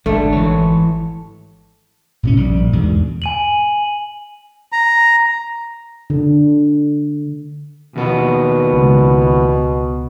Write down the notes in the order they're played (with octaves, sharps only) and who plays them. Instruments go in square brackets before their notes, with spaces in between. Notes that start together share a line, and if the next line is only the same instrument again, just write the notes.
[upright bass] G#1 [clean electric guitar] D3 D4 [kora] A3
[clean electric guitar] E3 C#5
[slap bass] A2 C3 C#4
A#1 G3
E2 G#2 B2 D3
[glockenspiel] G#5 D#7 F#7
[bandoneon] A#5
[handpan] D3
[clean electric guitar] D#2 B3 [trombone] B2
[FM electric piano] C#2